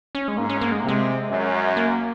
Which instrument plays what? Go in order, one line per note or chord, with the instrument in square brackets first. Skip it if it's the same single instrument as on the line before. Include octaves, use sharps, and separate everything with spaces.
[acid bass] C#4
G#3
[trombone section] G#2 [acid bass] A#3
[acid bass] C#4
A#3
G#3
A#3
[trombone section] C3 [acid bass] G#3
[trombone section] F#2
[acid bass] A#3